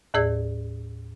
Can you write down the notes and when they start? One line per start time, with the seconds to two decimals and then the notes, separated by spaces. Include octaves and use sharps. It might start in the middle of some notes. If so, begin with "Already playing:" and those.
0.14 D#2 A2 G#4 D5 E6 G#6